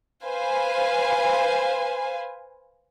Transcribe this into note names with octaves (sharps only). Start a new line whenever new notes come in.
B4 C5 F5 G#5